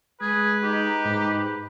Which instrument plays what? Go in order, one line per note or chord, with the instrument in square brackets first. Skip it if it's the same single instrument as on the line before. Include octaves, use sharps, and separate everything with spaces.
[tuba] G#3 [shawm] G#4 [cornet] B4
[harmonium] D#4 [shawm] G4
[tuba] G#2